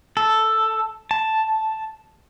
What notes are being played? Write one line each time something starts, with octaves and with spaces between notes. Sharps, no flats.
A4
A5